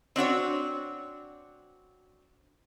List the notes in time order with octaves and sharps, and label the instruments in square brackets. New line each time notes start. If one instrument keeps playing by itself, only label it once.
[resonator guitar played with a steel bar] C4 D4 F#4 C#5